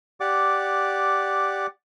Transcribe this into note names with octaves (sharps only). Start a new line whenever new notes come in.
G4 D5 F#5 D6